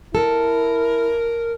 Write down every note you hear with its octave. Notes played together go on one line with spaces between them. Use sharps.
E4 A4 A#4